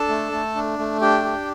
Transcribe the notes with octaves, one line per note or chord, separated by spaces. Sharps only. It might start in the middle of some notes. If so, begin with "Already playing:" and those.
Already playing: D4 A4 A5
A3
A3
D4
A3
D4 G4 G5
G4